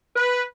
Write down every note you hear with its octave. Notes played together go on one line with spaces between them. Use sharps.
B4